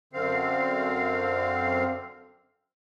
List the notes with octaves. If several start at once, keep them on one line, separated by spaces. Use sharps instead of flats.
F#2 D3 C4 F5